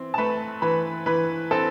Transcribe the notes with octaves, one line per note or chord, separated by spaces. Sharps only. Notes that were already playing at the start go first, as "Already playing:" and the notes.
Already playing: E3 C4
A5
A3 B4 B5
E3 B4 B5
E3 B4 B5
C4 A4 A5